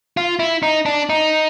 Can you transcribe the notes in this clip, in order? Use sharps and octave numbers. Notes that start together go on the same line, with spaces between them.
F4
E4
D#4
D4
D#4